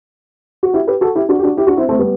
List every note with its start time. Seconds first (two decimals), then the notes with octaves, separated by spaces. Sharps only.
0.63 F#4
0.74 E4 G4
0.87 G4 B4
1.01 F#4 A4
1.15 E4 G4
1.29 D4 F#4
1.39 G4
1.43 D4 F#4
1.57 E4 G4
1.67 D4 F#4
1.77 C4 E4
1.89 A3 C4
1.99 G3 B3